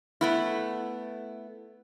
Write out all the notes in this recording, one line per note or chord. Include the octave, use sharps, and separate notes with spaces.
A3 B3 E4